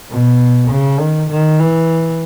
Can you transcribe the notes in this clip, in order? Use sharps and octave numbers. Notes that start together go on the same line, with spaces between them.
B2
C#3
D#3
D#3
E3